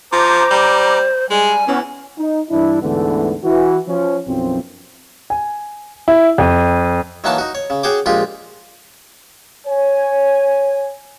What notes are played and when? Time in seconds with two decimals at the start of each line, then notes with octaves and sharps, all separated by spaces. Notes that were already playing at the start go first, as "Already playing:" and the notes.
0.12 F3 C5 A#5 D6
0.50 G3
1.30 G3 G#3 G#5
1.68 E3 B3 C#4
2.18 D#4
2.50 G2 E3 D4 E4
2.82 D2 G#2 D3 E3 A3 B3
3.44 E3 F#4
3.88 F3 C#4
4.27 B1 F#2 F3 C4
5.30 G#5
6.08 E4
6.38 F2
7.24 D#3 E3 F#3 A#3 F#5 A5
7.38 D#4 F#4
7.55 C#5
7.70 C#3
7.83 F#4 G#4 C#5 G5 D6
8.06 A#1 G#3 F4 G4
9.67 C#5 G#5